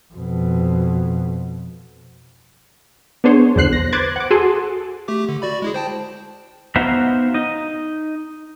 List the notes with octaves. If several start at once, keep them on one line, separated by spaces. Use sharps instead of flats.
F2 B2
B3 D4 G#4 C5 C#5
B1 E2 D3 C5 F#6 C7
A#6
B4 C5 D6 F#6 G#6 A6
F#5 D6
F#4 G#4 A4 G#5 C6
A3 G4 D6
D3
F#4 D5 B5
G#3 E4 G#4
C5 G5 A5
B3 D#4 F#4 C5 E5 F5
D#4 D#5